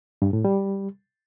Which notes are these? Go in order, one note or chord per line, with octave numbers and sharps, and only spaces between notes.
G2
A2
G3